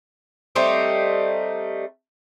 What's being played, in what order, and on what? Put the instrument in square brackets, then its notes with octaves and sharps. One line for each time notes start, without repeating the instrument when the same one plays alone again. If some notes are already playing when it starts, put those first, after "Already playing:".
[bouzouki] G3 A3 C4 D#4